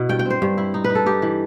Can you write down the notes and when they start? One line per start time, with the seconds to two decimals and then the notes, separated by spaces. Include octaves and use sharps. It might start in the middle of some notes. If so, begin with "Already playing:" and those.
Already playing: B2 E4
0.09 G2 G5
0.19 G5
0.26 C4 C5
0.42 G2
0.58 E4
0.74 D#4
0.84 B4
0.89 D#4
0.95 A4
1.06 D#4 G4
1.22 E3